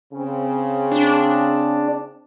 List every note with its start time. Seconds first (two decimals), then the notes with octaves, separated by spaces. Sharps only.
0.13 C#3 C4
0.92 D4